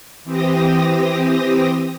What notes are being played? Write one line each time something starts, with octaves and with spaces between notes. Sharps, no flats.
E3 C4 G4 D#6 A#6